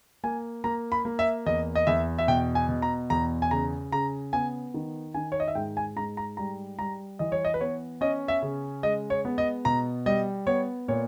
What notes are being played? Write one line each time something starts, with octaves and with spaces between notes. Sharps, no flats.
A#3 G#5
A#3 A#5
B5
A#3
E5
E2 D#5
D#5
E2 E5
E5
B2 G5
G#5
B2
A#5
E2 A#5
G#5
C#3 A#5
C#3 A#5
B3 G#5
D#3
D#3 G#5
C#5
D#5
E5
G#2 G5
G#5
G#2 A#5
A#5
G3 A#5
G3 A#5
E3 D#5
C#5
D#5
B4
B3 C#5
C#4 D#5
E5
C#3
G#3 D#5
C#5
B3
D#5
B2 A#5
G3 D#5
B3 C#5
A#2 C#5